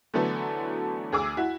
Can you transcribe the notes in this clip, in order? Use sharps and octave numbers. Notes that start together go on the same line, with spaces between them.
D3 E3 F#3 A3 B3 A4
D2 G#4 D6 E6
E4 F#4